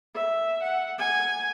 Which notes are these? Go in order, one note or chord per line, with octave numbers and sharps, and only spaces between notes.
E5
F#5
G#5